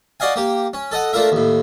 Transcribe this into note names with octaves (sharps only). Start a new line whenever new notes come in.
F#4 D5 D#5 F5 G#5
A#3 G4
C#4
A4 D#5 F#5
A3 D4 F4 A#4 E5
D#2 A2